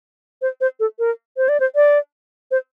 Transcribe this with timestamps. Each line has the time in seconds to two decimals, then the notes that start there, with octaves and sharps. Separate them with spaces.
0.42 C5
0.61 C5
0.80 A4
0.99 A#4
1.37 C5
1.49 D5
1.60 C5
1.75 D5
2.51 C5